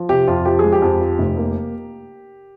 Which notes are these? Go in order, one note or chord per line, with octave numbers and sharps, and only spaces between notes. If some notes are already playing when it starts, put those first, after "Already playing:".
Already playing: F3
C3 G4
F2 F4
F3 G4
G#4
G#3
G4
F2
F3
F1
A#3